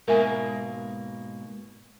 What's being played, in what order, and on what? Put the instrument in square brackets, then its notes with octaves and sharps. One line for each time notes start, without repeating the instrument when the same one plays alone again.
[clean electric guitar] G#2 B2 A#3 [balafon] A#4 E5 G#5